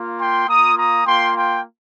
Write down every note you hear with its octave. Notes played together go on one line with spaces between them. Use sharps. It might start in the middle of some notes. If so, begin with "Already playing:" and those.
Already playing: A#3 F4
G5 C6
A#3 F4 A#5 D#6
A#5 D#6
A#3 F4 G5 C6
G5 C6